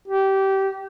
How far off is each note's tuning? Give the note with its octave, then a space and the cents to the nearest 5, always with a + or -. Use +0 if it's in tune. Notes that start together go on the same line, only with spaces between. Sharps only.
G4 -20